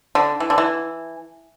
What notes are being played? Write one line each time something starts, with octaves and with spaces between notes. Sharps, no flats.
D3
E3
D3
E3